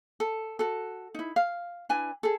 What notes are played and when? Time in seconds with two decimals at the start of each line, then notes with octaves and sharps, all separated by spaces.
0.20 A4
0.59 F#4 A4
1.14 D#4 E4
1.36 F5
1.89 D4 E4 B4 G#5
2.23 G#4 A4